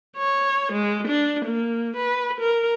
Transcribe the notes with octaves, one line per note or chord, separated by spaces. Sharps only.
C#5
G#3
D4
A#3
B4
A#4